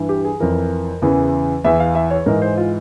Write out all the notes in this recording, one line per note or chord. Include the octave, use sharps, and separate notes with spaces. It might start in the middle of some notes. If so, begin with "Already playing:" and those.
Already playing: G2 E3
G4
G#4
F2 E3 A#4
E2 C#3 E3
E2 E3 E5
F5
E5
C#5
G#2 E3 A#4
C5
F4